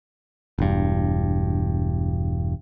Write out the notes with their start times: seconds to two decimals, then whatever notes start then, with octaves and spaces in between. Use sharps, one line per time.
0.58 E1 G2